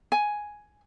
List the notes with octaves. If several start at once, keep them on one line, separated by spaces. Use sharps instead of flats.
G#5